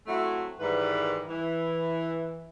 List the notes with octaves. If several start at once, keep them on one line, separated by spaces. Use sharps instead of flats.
F#3 A3 C4 E4
G#2 D#3 E3 G3 B4
E3